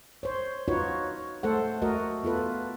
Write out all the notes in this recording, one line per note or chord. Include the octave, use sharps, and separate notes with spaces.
C5 C#5
D#4 F4 F#4 B4 C#5
A3 A4 C5 F#5
A3 F#4 A#4 D#5
B3 F4 A4 B4